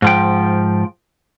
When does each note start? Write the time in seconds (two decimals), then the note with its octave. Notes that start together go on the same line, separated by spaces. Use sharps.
0.02 G#2 F3 G5